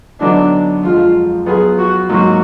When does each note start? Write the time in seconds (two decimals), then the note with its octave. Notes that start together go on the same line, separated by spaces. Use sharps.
0.20 D3 F#3 B3 D4 D#4
0.83 F2 F3 G#3 F4
1.46 F#3 B3 F4 G#4 B4
1.78 F#4
2.09 G#2 F#3 A#3 F#4